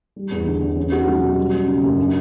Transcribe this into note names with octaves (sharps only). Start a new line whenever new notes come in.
G3
E2
D3
E2
C#4
F#4
F#3
B2
G3
C#4
C#3
F#2
D4